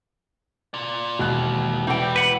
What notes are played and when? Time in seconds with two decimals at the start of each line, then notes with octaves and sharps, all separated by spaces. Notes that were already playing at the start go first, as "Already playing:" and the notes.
0.74 F4 D5
1.19 E1 D#2 F#6
1.87 E3 G3 C4 G5
2.16 B4 F#5